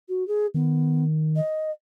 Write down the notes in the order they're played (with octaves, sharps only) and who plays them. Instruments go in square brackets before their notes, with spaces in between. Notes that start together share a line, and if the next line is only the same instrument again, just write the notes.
[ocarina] F#4
G#4
[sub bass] D#3 [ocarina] B3
[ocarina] D#5